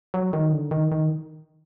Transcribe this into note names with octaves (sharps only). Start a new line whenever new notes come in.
F#3
D#3
D3
D#3
D#3